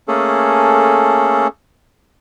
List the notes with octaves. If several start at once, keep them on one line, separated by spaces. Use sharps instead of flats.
A3 A#3 C#4 G#4 A4